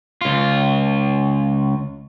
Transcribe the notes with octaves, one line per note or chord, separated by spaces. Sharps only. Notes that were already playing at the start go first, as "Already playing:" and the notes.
C#2 F4